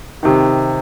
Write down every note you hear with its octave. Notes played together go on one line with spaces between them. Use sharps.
C3 D#3